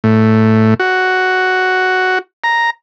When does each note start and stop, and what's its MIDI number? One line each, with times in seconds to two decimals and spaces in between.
0.04 0.74 45
0.80 2.19 66
2.44 2.70 82